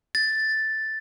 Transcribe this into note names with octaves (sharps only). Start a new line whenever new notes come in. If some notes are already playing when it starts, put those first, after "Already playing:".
A6